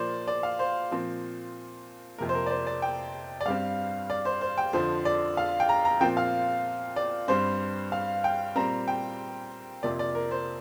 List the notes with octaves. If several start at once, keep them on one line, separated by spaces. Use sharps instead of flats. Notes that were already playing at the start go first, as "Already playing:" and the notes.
Already playing: A#2 F3 A#3 C5 D5
D5
F5
C5
A#2 F3 C4
F2 C3 A#3 A#4
C5
A#4
D5
C5
D5
G5
D5
G2 G3 C4 F5
D5
C5
C5
G5
F2 D3 F3 C5
D5
F5
G5
A#5
A#5
A#2 F3 C4 G5
F5
D5
G2 G3 C4 C5
F5
G5
A#2 G3 C4 A#5
G5
F2 C3 F3 A#3 D5
D5
A#4
C5